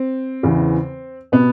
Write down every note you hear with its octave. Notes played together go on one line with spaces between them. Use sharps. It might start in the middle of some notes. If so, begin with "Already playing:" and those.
Already playing: C4
E2 C#3 E3
B2 B3